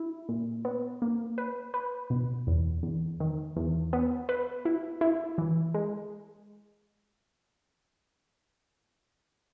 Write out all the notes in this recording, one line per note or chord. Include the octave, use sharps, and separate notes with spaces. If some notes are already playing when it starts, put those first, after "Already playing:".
Already playing: E4
A#2
B3
A#3
B4
B4
B2
E2
E2
D#3
E2
B3
B4
E4
E4
E3
G#3